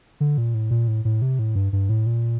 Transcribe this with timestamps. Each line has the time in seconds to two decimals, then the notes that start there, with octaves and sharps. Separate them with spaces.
0.20 D3
0.38 A#2
0.54 A2
0.71 A#2
0.88 A2
1.05 A2
1.22 C3
1.39 A2
1.55 G2
1.73 G2
1.89 A2
2.06 A#2